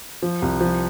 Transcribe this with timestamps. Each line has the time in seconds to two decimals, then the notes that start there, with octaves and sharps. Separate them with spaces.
0.22 F3
0.42 C2
0.61 F3